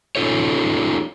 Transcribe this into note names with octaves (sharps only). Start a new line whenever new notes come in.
C#4 D#4 F4 A4 C#5